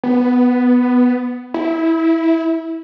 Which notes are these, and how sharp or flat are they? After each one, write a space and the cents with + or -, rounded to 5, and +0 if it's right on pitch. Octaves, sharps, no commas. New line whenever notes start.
B3 +5
E4 -15